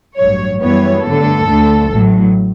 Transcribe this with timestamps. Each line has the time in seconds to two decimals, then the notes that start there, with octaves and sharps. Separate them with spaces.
0.17 A1 G2 F#3 C#5
0.60 F#2 E3 G3 B3 C#5
1.03 G2 D3 A3 A4
1.46 D2 D3 A3
1.90 A1 A2 F#3